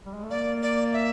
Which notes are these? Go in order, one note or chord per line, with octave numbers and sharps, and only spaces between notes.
G3
G#3
A3
A#3 D5
D5
E5